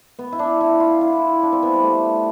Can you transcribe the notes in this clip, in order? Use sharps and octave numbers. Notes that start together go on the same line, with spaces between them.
B3
E4
D4
E4
F4
E4
D4
C4
B3
G3
A3